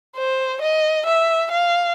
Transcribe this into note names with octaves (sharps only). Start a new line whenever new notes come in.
C5
D#5
E5
F5